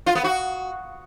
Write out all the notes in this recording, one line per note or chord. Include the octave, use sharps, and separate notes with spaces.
F4
B3
F#4